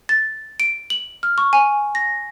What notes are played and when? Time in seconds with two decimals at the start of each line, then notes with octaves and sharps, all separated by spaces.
0.09 A6
0.60 D7
0.90 F#7
1.23 F6
1.38 C#6
1.53 G#5
1.95 A#6